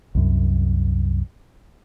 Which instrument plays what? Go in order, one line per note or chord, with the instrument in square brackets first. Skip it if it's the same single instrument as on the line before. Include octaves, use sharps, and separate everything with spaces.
[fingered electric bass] C2 F#2